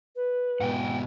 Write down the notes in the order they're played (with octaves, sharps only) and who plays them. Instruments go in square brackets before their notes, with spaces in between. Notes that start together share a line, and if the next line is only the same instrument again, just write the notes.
[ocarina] B4
[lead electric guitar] G#2 B2 [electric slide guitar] F#5 G5